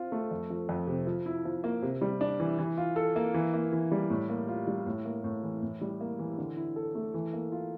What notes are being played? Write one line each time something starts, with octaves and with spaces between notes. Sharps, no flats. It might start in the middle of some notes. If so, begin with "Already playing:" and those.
Already playing: C4 F4
A3
F2
F3
F2
C3
F3
E4
F3
A#3
C3
G3
D4
E3
E3
F4
A4
A#3
E3
A#3
E3
G3
A2
A#3
F4
G3
A2
A#3
A2
E3
A2
G3
A#3
E3
D3
E4
A4
A3
E3
A#3
F4